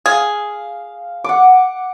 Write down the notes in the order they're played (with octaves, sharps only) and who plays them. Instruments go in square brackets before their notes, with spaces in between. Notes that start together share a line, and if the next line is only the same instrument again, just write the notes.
[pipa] G#4 [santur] F5
[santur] F#5 D6